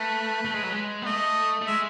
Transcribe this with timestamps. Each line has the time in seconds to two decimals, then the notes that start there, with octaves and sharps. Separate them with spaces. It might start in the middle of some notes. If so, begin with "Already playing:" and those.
Already playing: A3 B4
0.45 A3
0.54 G#3
0.63 F#3
0.72 G#3
1.02 B3
1.06 A3 D#5
1.61 A3
1.67 G#3 E5